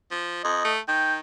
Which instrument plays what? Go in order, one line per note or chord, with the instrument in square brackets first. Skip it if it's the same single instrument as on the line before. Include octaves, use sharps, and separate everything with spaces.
[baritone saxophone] F3
[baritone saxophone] F2 [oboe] D#5
[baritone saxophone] A3
[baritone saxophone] D#3 [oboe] G5